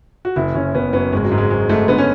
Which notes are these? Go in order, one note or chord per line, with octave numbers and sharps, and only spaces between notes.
F#4
F#1 E4
F#1 C#4
F#1 B3
F#2 B3
G#1 G#3
F#3
G#2
G#3
F#3 G#3
G#2 A3
D3 B3
C#4